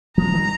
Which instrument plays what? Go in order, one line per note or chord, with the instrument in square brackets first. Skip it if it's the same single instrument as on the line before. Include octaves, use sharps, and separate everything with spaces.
[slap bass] F3 G#3 [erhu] A#5
[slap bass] D#3 G3